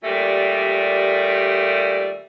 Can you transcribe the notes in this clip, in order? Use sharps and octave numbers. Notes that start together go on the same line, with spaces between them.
D#2 A#2 G3 A3 D5